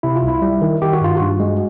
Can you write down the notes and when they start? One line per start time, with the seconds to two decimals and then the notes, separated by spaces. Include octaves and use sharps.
0.03 C3 E4
0.16 F4
0.23 C2
0.28 E4
0.42 G3
0.61 D#3
0.82 D#3 G4
0.93 F#4
1.01 G2 F4
1.17 G2 F#4
1.40 G#3